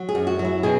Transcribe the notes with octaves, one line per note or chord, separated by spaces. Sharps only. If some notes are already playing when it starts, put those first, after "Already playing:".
Already playing: F#3
G#4
F#2
F#4
F#3
E4
B2 G#4